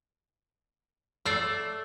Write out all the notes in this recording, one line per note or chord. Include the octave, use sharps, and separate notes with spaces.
A3 D5 E6 A6 C7